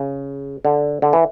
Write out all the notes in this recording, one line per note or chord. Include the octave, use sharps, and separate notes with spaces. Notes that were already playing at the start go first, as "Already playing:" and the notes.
Already playing: C#3
D3
D3
E3